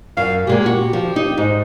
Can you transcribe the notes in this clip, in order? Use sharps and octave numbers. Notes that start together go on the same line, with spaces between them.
F#2 F5
A#2 G#3 A#3 G4
F#4
F3
D#4
G#2 D#4